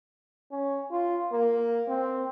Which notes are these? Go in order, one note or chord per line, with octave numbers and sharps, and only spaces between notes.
C#4
F4
A#3
C4